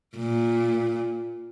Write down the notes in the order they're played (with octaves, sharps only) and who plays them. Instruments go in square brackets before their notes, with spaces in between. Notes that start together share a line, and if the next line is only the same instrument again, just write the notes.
[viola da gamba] A#2